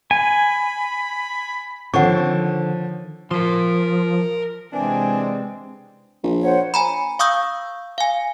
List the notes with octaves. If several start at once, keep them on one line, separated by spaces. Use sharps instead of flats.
G#5 B5
D3 D#3 F3 C4 C#5 F#5 C#6
F3 A#4 C6
C3 E3 G#3 C4 D4 G#5
A#1
C5 C#5 F#5
G#5 A#5 B5
F5 C#6 D#6 E6 G6
F5 G#5